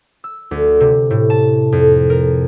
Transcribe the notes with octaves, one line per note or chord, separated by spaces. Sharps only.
E6
D2
C3
A2
A5
F2
A#4